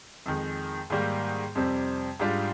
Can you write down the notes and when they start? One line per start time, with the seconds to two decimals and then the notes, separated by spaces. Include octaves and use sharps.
0.26 F2 D#3 G#3
0.90 G#2 D#3 G3 A#3
1.55 F2 C3 G3 C4
2.20 G#2 G3 D4 F4